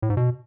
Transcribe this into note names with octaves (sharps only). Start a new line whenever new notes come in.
A2
G#2
B2